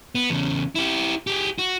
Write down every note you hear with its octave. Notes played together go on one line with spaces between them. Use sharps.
B3
E2 C#3
E4 G4
G4 G#4
F#4